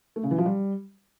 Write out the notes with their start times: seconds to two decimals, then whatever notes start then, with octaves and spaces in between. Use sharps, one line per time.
0.16 A3
0.23 C#3
0.31 E3
0.38 F3
0.46 G3